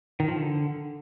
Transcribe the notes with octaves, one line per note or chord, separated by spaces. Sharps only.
D#3
F3
D3